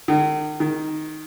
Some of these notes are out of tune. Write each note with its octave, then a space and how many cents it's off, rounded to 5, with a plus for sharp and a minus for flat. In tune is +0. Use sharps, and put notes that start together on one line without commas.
D#3 -35
D#3 +0